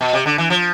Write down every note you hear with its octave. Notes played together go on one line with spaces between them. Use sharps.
B2
C3
D3
E3
F3